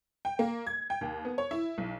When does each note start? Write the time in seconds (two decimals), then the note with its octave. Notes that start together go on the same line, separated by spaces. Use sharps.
0.25 G5
0.39 A#3
0.67 G#6
0.90 G5
1.01 D#2
1.25 B3
1.38 C#5
1.51 E4
1.78 B1